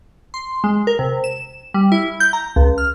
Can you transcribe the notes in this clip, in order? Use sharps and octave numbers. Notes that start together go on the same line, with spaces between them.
C6
G#3
A#4
C3
E7
G3
E4
G6
A#5
C#2
F6